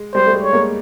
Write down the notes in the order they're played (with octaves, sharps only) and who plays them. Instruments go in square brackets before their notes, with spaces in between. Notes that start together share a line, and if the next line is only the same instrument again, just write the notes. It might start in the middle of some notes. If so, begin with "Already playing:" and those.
Already playing: [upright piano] G#3
[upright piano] G3 [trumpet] C5
[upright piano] A3
G#3
[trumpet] C#5
[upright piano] G#3 A#3